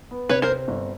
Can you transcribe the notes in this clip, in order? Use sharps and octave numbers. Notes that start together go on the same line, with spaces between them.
B3
C3 B4 C#5
A#4 C5
C4
G1